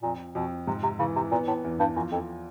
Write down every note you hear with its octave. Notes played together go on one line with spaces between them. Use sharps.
F2 A#2
F2 B2
G#2 C3
C3
C#3 E3
C3
A#2 B3
A2
E2
G2
F#2 F3
F2